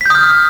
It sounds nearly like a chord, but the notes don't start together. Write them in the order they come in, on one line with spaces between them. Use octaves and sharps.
B6 G6 D#6 F6